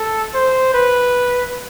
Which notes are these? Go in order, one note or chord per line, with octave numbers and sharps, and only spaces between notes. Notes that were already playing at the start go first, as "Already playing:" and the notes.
Already playing: A4
C5
B4